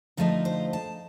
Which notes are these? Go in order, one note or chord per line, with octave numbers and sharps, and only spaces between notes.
D3 F3 A3 D#4 A#4
C5
A5